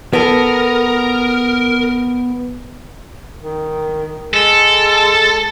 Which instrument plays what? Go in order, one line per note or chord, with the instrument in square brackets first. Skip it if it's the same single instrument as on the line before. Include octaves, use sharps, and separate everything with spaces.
[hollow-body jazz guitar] B3 A4 [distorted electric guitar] A#4
[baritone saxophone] D#3
[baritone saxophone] G#3 [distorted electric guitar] A4